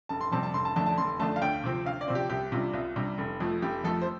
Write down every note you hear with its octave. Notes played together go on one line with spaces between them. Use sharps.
F1 A5
C6
F2 C3 G3 C4 A5
A5
F1 C6
A5
F2 D3 A3 A5
A5
F1 C6
F2 D3 A3 A5
F5
D2 G5
C3 F3 C4
D2 F5
D5
C3 F3 C4
G4
C2 G4
C3 G3 D4 F4
C2 F4
C3 G3 D4
F1
F2 F3 A3
F1 G4
F2 F3 A3 A4
C5